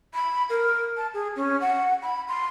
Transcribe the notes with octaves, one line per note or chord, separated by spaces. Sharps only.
B5
A#4
A5
G#4
C#4
F#5
B5
C6